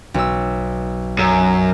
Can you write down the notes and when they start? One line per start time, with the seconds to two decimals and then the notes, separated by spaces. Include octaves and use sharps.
0.14 B1 E6
1.19 F#2